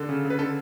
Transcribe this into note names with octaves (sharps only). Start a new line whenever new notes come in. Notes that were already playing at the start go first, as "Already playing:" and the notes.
Already playing: D3 A4
C#3
C#3
B4
D3 A4